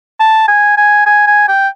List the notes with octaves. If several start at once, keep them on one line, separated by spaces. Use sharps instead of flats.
A5
G#5
G#5
G#5
G#5
G5